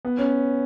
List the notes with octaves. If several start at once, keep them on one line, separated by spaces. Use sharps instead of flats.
B3
C#4